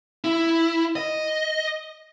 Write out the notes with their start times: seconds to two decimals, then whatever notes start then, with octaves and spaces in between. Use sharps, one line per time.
0.24 E4
0.96 D#5